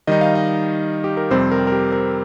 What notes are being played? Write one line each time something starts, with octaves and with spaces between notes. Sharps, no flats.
D#3 G3 D#4 D#5
F5
D#5
G4
A#4
F2 C3 G3 C4 C5
A#4
A#4
G4
A#4